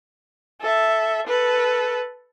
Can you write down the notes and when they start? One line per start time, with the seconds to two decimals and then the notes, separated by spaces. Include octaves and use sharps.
0.61 A4 E5
1.27 A4 B4